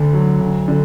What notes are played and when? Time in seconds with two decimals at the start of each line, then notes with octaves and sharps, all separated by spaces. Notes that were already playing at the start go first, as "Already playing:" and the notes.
Already playing: D2 D3
0.13 F#3
0.41 D2
0.68 D3